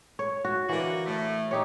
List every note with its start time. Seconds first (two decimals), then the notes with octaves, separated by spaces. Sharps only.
0.19 C#5
0.45 F#4
0.69 D3 E3 A#3 F#4
1.06 A2 A3
1.51 D#4 G4 C#5